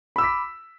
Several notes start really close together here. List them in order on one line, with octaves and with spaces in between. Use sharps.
B5 E6 D6 B6